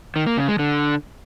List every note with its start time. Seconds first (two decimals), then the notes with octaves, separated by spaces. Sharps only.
0.16 D#3
0.27 A#3
0.37 C#3
0.48 G#3
0.59 D3